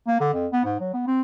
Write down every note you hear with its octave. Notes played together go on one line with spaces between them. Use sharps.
A#3
D3
F2
B3
G#2
F#3
B3
C4